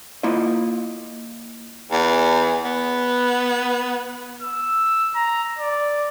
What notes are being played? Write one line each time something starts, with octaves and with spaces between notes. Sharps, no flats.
A#3 E4 F4 D#5
E2
B3
E6
A#5
D5